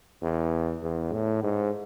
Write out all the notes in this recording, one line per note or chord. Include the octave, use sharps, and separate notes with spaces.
E2
E2
A2
G#2